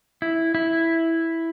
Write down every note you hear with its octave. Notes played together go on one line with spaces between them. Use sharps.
E4
E4